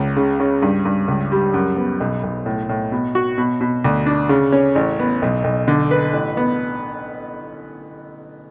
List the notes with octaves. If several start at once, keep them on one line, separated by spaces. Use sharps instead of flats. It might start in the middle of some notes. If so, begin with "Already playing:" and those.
Already playing: C#2
C#3
C#3
G2
G2
C#2
G3
F#2
B3
B1
B1
A2
A2
B2
F#4
B2
B2
D2
D4
C#3
C#4
A1
B3
B1
B1
D3
B4
A1
B3